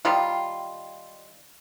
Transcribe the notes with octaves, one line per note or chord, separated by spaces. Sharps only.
D#3 G3 F4